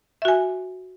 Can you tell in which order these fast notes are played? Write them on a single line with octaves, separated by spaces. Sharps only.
E5 F#4 G#5